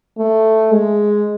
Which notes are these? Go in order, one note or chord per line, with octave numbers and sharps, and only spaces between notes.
A3
G#3